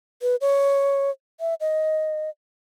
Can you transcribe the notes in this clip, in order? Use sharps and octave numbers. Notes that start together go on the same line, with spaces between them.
B4
C#5
E5
D#5